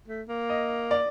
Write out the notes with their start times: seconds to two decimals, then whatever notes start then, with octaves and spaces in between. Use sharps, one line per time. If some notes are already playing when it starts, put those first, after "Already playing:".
0.08 A3
0.28 A#3
0.50 D#5
0.91 D5